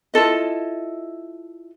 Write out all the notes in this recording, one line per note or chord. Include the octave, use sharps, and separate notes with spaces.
E4 F4 A4 D#5